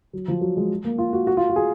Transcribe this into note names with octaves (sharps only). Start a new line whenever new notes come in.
F#3
F3
F#3
G#3
A#3
F4
F#4
F#4
F4
F#4
G#4